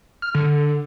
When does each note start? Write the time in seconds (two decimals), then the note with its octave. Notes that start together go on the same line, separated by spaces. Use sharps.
0.22 F6
0.35 D3